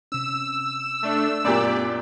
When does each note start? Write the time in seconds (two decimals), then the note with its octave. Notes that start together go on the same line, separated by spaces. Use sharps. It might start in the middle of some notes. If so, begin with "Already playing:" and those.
0.12 C3 C#4 E6
1.03 A3 D4
1.44 F#2 A#2 A3 B3 G4 D5